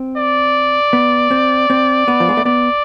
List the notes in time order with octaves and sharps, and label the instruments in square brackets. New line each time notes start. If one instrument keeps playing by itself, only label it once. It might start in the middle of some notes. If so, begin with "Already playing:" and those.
Already playing: [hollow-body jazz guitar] C4
[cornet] D5
[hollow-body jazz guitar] B3
C4
C4
B3
F3
G#3
A3
[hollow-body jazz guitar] B3 [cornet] D5